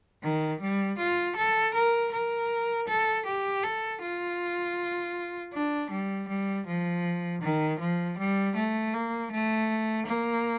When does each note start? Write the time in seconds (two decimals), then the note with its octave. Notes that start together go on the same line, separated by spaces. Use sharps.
0.22 D#3
0.61 G3
0.98 F4
1.36 A4
1.74 A#4
2.12 A#4
2.88 A4
3.26 G4
3.63 A4
4.01 F4
5.53 D4
5.91 G3
6.28 G3
6.67 F3
7.42 D#3
7.80 F3
8.18 G3
8.56 A3
8.94 A#3
9.31 A3
10.07 A#3